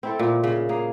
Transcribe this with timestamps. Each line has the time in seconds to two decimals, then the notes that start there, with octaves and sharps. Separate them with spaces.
0.03 C4 E4 A4
0.19 A#2
0.44 C#3
0.69 A#3 G#4